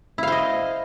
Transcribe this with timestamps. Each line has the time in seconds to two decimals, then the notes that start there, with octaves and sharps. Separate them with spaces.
0.18 E4
0.23 F5
0.27 C5
0.32 D#5